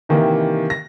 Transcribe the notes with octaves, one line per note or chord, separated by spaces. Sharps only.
C3 D#3 E3 A#3 G4
A#6